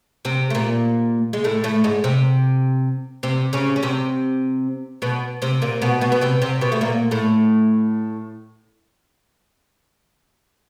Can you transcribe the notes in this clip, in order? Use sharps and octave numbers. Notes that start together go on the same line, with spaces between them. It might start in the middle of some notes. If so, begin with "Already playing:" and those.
C3 C4
A3
A#2 A#3
G#3
A2 A3
A2 A3
G#2 G#3
C3 C4
C3 C4
C#3 C#4
C#4
C3 C4
B2 B3
C3 C4
A#2 A#3
B2 B3
B2 B3
B3
C3 C4
C3 C4
B2 B3
A3
A#2 A#3
A2 A3